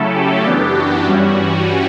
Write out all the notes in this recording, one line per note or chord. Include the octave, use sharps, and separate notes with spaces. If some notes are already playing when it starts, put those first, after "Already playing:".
Already playing: C#3 F#3 A3 C#4 E4 A4
G4
F#2 E3 B3 D4 G4
F#4
G2 E3 G3 C#4